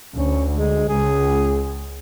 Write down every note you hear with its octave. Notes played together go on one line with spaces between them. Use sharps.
D2 C#4
G#3
C#2 G#4